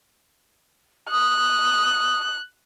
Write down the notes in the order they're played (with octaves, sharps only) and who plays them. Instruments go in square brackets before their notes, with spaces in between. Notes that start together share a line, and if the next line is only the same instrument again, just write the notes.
[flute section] D#6 [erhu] F#6